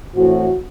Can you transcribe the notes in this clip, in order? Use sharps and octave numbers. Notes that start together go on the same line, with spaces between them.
A2 E3 C4 F#4